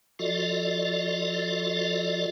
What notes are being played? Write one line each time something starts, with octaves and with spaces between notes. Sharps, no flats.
F3 F4 F#4 A4 D5 D#5